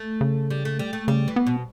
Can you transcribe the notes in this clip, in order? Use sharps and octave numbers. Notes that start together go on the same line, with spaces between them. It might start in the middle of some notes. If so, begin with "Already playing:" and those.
Already playing: A3
C#3
G3
A3
G3
A3
C#3 G3
E3
B3
B2